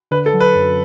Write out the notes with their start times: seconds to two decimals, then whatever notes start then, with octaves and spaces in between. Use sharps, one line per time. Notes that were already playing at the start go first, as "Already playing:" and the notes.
0.11 D3 B4
0.26 A4
0.33 F#3
0.40 B4
0.55 F#2